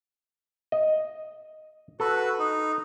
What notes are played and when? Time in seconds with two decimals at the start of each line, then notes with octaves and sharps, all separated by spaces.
0.72 D#5
2.00 F#4 A4 B4
2.39 D#4